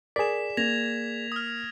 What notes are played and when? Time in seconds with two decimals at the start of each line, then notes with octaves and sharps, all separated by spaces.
0.16 G#4 A#4 D5 B6 E7
0.57 A#3 G#6 A#6 F7
1.32 D#6 F6